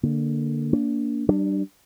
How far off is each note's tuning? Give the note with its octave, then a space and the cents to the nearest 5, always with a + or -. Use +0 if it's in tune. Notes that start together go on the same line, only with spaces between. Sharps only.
D3 +0 A#3 +0
A#3 +0 D4 -30
G3 -25 D4 +20